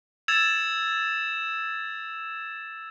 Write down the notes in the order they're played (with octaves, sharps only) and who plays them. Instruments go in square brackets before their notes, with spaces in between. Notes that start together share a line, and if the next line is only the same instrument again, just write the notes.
[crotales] E6 G#6 A6 E7 F7